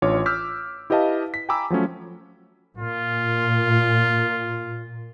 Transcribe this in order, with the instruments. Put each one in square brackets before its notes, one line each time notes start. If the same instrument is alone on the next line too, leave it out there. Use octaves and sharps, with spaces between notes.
[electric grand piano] A1 D4 F4 C#5 D6
D6 E6 F6 G6 B6
E4 G4 B4 D#5 F5 A5
B6
G5 G#5 A#5 B5 D6 E6
F3 F#3 A3 C#4
[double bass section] A#2 [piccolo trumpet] F4